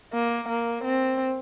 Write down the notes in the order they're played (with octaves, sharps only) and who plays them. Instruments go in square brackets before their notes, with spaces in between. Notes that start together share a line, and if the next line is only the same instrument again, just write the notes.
[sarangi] A#3
A#3
C4